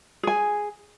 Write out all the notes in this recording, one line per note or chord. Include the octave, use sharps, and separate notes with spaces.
G#4 G#5